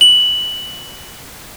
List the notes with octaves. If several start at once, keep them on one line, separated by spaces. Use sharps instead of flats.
F#7